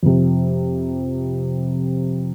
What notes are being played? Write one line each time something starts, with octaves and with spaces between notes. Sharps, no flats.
F2 C3